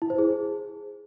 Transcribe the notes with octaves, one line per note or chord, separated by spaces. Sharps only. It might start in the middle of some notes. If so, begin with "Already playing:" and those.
E4
C5
G#4